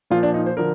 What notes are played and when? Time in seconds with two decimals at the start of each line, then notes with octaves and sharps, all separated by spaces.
0.10 A#2 F3 F4
0.23 D4
0.34 D#4
0.46 C5
0.57 D3 F3 A#4